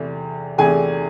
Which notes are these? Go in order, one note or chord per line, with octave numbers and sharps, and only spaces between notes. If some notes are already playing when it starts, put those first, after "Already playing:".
Already playing: E2 C3 E3 A3
E2 C3 E3 A3 G#4 G#5